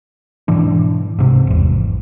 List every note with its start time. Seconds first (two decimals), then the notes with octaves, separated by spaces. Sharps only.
0.48 G#2 B2 E3 D4
1.19 G#2 C3
1.47 G#1 E2